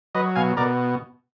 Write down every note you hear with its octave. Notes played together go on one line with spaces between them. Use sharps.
F#3 B4 D#5
B2 F5 G#5
B2 A#4 D5